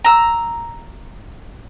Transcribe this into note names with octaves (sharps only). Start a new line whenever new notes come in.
A#5 E6